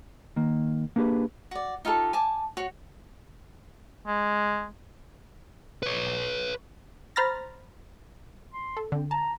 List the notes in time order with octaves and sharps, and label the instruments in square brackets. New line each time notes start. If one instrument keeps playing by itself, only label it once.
[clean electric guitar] D#3 A#3
A#3 B3 D4 G4 G#4 B4
[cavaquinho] F#4 D5
D#4 F4 G4 A4
G#5 A5 D6
F#4 C#5
[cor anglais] G#3
[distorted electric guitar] B4 C#5
[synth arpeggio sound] C5 A#5 B5 F6 A6 A#6
[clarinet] C6
[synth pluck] A4
[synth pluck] D3 [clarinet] C4
[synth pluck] A5 [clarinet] A#5